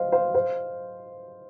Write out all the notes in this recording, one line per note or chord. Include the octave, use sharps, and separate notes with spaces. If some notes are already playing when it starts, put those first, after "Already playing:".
Already playing: C5 D#5 F5
C5 F5
C5 F5